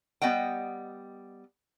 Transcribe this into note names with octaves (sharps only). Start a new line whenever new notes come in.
G3 B3 D#5 F#5 G5